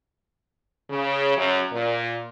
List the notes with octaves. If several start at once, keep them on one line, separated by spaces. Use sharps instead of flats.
C#3
F#2
A#2